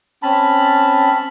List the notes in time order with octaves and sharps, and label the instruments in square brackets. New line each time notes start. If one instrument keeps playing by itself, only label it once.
[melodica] C4 C#4 A5 B5